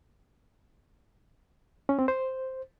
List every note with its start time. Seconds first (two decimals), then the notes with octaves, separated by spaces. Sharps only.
1.89 C#4
1.99 C4
2.08 C5